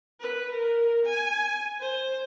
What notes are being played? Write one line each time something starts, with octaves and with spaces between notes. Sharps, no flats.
B4
A#4
G#5
C5